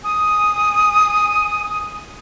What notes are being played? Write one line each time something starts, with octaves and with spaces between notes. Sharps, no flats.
G#5 D#6